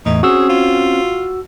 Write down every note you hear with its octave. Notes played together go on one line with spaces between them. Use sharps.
E2 A2 D#4
C4 C#4 F#4 G#4 E6
F4